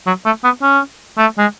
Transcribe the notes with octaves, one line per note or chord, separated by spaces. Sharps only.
F#3
A3
B3
C#4
A3
G#3